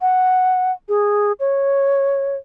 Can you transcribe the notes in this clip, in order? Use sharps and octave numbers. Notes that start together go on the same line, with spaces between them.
F#5
G#4
C#5